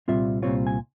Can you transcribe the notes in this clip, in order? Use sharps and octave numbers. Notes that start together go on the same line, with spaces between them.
C2 A#2 G3 C4 F4 E5
C2 A#2 G3 C4 F4 C#5
G#5